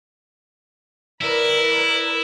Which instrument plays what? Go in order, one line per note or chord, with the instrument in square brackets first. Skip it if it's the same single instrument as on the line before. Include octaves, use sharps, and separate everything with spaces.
[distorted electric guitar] E4 [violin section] A#4 B4 D5